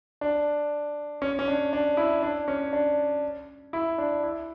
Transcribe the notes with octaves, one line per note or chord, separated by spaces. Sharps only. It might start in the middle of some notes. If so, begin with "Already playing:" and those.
D4
C#4
C#4
D4
D4
E4
D4
C#4
D4
E4
D4
E4